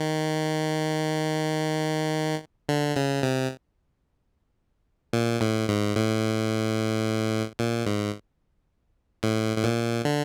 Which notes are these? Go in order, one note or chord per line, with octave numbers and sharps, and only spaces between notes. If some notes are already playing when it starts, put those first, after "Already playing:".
Already playing: D#3
D3
C#3
C3
A#2
A2
G#2
A2
A#2
G#2
A2
A2
A#2
D3